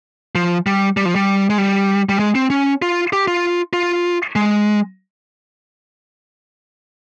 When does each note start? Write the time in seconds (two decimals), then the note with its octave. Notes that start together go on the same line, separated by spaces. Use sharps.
0.35 F3
0.66 G3
0.97 G3
1.05 F3
1.15 G3
1.50 G#3
1.58 G3
2.09 G3
2.19 G#3
2.35 C4
2.50 C#4
2.82 F4
3.13 G4
3.28 F4
3.73 F4
4.36 G#3